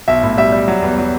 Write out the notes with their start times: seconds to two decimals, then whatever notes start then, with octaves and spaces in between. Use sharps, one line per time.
0.08 B1 E5
0.23 A2
0.38 G3 E5
0.52 G3
0.68 F#3
0.82 E2
0.98 F#3